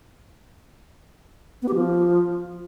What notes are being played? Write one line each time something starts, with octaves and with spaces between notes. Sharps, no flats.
B3
G4
F3